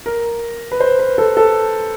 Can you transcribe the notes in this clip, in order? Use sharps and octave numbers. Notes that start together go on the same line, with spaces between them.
A#4
B4
C5
B4
A4
A4